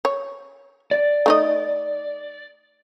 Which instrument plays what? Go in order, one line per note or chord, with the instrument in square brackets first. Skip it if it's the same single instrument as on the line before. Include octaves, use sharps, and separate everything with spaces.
[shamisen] C#5
[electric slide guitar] D5
[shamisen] A3 D#4 D#5